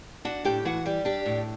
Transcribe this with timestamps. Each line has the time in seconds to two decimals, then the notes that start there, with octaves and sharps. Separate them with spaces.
0.25 D4 F#4 F#5
0.45 A2 G4 G5
0.65 E3 F#4 F#5
0.86 G3 G4
1.05 D4 G4
1.26 A2